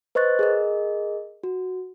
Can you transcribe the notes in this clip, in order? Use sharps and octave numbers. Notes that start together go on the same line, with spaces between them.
B4 C5 D#5 C#6 F#6 A6
G#4 A#4 D#5
F#4